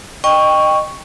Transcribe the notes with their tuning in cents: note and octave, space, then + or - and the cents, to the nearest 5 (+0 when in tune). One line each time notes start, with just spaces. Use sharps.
D#5 -20 G5 +10 C#6 +0